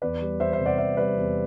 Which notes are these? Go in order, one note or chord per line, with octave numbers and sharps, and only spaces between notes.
E2 B4 D5
G3
E2 C5 E5
C5 E5
C3
D5 F#5
E2 C5 E5
G3 B4 D5
E2